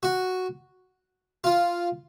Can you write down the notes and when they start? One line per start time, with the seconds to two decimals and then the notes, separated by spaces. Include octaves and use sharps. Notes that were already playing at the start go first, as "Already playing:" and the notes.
0.03 F#4
1.44 F4